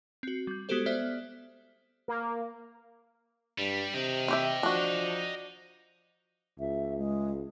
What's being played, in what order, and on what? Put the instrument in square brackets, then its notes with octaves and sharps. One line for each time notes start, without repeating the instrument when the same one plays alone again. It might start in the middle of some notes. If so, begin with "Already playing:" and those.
[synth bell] C4 F#4
G3 G6
G#3 B3 F#4 G4 A4 C5
B3 C5 D5 E5 F6
[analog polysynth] A#3
[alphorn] G2 [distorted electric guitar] G3
[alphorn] C3 [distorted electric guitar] D#5 G5
[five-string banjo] C4 G4 E5
[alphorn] F3 [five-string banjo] D4 F#4
[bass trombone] C#2 [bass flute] E5
[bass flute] G#3